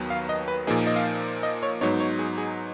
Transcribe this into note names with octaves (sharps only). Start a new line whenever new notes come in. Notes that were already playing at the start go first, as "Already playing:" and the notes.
Already playing: D#2 D#3 F#3 B3
F5
D#5
B4
A#2 F3 A#3 D#4 G#4
D#5
F5
D#5
C#5
G#2 F#3 B3 D#4 C#5
C#5
G#4
G#4